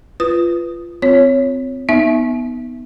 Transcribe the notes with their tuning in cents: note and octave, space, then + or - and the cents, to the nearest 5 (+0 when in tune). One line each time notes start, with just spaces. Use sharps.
F4 -20 B4 +0 D#6 +0
C4 -20 F4 +0 C#5 +0
B3 +0 D#4 +0 E5 +5